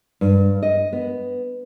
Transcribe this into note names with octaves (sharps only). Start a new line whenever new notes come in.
G2
D#5
B3